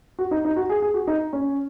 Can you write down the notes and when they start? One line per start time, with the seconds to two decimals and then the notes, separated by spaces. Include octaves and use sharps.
0.19 F#4
0.31 D#4
0.45 D#4
0.56 F#4
0.70 G#4
0.82 G#4
0.94 F#4
1.07 D#4
1.33 C#4